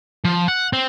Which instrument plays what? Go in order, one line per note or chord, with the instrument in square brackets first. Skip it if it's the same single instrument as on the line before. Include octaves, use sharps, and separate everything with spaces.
[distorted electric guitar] F3
F#5
C4